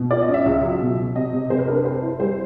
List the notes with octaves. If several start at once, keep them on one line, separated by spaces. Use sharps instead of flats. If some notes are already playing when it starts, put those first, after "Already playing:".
Already playing: B2
F4 D5
D#5
C#4
E5
C#2
F#3
B2
B2
C3 D#5
C3
C3 C5
B4
D4 A#4
B4
C4 C5
E4
G3 C5